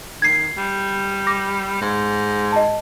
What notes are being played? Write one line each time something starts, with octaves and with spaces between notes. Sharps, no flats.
D#3 G#6 C7
G3
D6 A#6
G#2
D#5 A5